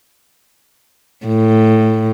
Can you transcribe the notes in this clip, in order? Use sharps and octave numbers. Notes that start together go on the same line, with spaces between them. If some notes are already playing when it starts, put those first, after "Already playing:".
A2